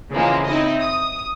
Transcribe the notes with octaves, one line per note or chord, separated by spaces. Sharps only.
C#3 E3 F3 G#3 A#3
C4 D#4 E4 D#5
D#6